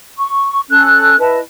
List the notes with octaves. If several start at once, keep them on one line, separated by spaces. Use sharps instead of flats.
C#6
C#4 A4 F#6
E4 B4 D#5 A5